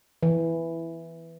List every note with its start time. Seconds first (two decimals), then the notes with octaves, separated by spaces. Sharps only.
0.23 E3